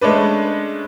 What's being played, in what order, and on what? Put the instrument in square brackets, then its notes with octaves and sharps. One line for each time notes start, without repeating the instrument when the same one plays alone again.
[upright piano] G#3 A3 C#4 D4 B4